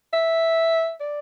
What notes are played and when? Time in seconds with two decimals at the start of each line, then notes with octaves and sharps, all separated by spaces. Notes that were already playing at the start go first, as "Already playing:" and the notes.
0.13 E5
1.01 D5